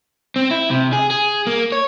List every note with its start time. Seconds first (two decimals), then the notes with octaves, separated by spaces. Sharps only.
0.36 C4
0.51 E4
0.71 C3
0.93 G#4
1.10 G#4
1.47 A#3
1.72 C#5